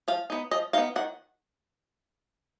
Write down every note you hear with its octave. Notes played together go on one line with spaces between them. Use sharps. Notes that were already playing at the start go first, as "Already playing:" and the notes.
F3 F5
B3 D#4
F3 D#5
B3 D#4 F5
D#3 F#5